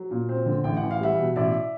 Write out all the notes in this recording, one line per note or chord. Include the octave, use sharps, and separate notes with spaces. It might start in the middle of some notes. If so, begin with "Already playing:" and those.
Already playing: F#3
A#2
C4
D3
A1 G5
F#5
E3
F5
G3 E5 F#5
B2
A1 D5 E5